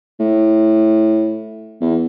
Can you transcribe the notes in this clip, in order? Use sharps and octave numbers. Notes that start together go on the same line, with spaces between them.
A2
E2